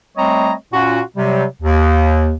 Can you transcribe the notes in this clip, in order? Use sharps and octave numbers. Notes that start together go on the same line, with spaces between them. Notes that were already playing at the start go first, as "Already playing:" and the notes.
G3 A3 C4 C#5 D#5 A#5
A#2 C#4 F4 F#4
C3 F#3 G3
D#2